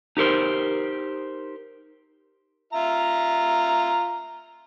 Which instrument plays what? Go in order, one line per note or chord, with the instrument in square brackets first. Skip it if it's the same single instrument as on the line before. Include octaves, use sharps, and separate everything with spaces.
[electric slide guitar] D#4 G4 A#4 C5
[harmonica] F4 E5 A#5